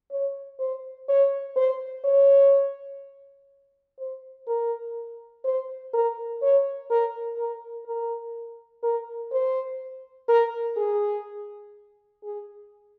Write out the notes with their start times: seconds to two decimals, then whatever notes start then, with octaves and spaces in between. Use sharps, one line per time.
0.11 C#5
0.59 C5
1.09 C#5
1.56 C5
2.05 C#5
3.99 C5
4.48 A#4
5.44 C5
5.94 A#4
6.42 C#5
6.90 A#4
7.38 A#4
7.86 A#4
8.83 A#4
9.32 C5
10.29 A#4
10.77 G#4
12.23 G#4